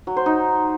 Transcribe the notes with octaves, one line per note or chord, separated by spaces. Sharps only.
F#3
C5
D#4